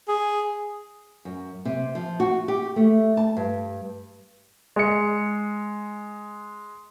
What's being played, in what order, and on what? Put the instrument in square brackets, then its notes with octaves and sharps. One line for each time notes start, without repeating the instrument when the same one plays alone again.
[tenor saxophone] G#4
[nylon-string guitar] F#2
C3
F3
F#4
G4
A3
A5
G2
[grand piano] G#3 C#7